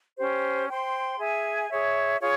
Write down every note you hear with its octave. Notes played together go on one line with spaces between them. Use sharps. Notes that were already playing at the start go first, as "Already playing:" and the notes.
C#4 G4 C5
C5 G5 C6
G#4 E5 G#5
G#4 C#5 E5
F4 G#4 C#5